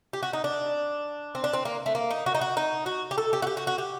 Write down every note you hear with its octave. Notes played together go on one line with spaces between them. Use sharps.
G4
F#4
D#4
D4
C4
D4
C4
A#3
A3
A#3
D#4
F#4
D#4
F#4
D#4
F#4
G4
A4
G4
F#4
G4
F#4
F#4
G4